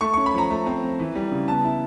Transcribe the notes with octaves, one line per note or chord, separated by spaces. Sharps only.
A3 C#6
C#4 C#6
B5
F3 A#5
A3
C4
F3
E3
G3
C#3
B3 A5
E4